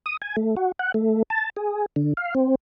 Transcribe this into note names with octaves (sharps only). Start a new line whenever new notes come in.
D#6
G#5
A3
F#4
F#5
A3
A5
G#4
D3
F5
C4